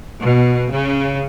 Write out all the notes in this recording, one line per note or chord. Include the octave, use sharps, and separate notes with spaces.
B2
C#3